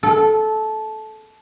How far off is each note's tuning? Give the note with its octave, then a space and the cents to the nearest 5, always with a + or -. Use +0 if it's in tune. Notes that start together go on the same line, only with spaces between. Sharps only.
A4 -15